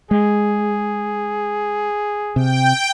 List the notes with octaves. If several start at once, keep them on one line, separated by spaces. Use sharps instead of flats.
G#3 G#4
C3 G5